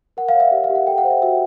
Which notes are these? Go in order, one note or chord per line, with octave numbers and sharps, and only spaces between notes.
A#4 F#5
F5
C#5
E5
G4 F5
F5
G4
F#5
A4 G5
F#5
C5
E5
F#4 E5